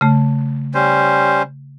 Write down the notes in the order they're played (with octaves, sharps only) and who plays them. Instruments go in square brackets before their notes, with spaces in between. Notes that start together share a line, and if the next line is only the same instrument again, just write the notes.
[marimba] C#3 A3
[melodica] G3 C#4 C5